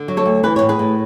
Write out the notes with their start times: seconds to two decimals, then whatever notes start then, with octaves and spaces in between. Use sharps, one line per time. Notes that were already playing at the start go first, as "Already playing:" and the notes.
Already playing: D3
0.08 F#3
0.17 A4 C#5
0.26 D2
0.43 E3 B4
0.56 C#5
0.62 A2
0.69 G#4 B4
0.79 A2